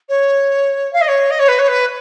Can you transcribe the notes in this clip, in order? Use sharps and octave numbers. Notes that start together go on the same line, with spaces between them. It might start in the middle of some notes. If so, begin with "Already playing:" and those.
C#5
F5
D#5
C#5
D#5
C#5
B4
C#5
B4